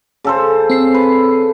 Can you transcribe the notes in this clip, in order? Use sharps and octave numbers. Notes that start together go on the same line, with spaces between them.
C#3 A4 C5
C4 C7
B4